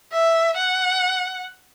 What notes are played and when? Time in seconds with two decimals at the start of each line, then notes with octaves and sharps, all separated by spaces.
0.13 E5
0.57 F#5